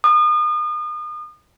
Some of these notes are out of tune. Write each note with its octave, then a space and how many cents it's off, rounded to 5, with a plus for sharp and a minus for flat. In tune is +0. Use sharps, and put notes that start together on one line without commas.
D#6 -35